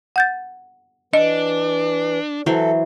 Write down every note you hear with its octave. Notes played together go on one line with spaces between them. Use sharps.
F#5 G6 A6
E3 D4 D#5
E3 F#3 A4 C5